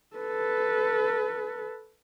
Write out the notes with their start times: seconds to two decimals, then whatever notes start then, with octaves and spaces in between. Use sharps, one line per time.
0.17 A4 B4